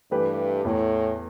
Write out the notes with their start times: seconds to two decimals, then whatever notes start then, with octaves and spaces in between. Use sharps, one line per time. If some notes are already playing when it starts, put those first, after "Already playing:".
0.11 G2 E3 A3 G4 B4
0.64 E2 A2 E3 A3